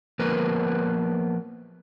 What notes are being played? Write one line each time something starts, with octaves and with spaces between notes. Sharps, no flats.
F3 A#3 B3 A#4 B4